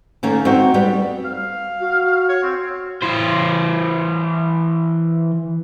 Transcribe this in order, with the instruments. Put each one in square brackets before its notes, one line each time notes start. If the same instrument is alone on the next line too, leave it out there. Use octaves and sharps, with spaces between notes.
[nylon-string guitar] D#3 A3 A#3 C#4
C4 D#4 F#4
G3 B3
[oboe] F5
[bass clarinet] F#4
[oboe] C#5
C4
[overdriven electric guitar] E3 C5